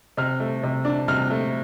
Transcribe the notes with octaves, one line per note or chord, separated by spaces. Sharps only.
C3 F6
A3
C3
D4
C3 F6
A3